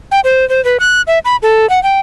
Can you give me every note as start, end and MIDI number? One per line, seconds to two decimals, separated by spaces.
0.11 0.20 79
0.24 0.47 72
0.49 0.64 72
0.65 0.77 71
0.80 1.02 90
1.07 1.19 76
1.25 1.36 83
1.42 1.69 69
1.70 1.82 78
1.83 2.00 79